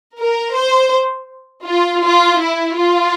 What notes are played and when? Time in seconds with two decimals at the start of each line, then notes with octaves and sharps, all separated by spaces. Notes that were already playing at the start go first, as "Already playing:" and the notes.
0.19 A#4
0.56 C5
1.67 F4
2.04 F4
2.41 E4
2.78 F4